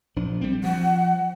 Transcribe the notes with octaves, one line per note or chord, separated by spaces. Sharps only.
A#1 F3 D4
G3 C4
F3 F#5